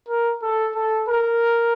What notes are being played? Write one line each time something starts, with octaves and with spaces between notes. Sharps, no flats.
A#4
A4
A4
A#4